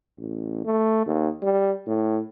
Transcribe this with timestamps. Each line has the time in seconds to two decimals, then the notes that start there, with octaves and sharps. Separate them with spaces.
0.18 A1
0.65 A3
1.06 D#2
1.42 G3
1.87 A2